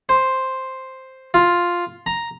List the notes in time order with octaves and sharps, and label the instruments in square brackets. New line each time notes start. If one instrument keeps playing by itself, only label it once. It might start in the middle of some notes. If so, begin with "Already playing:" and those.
[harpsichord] C5
F4
A#5